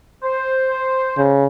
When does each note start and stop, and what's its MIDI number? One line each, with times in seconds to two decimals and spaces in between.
0.24 1.35 72
1.17 1.46 49